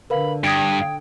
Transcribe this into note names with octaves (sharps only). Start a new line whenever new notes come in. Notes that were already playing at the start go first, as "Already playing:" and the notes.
D3 A#4 B4 F5 B5
G2 G5 D#6 G#6 D7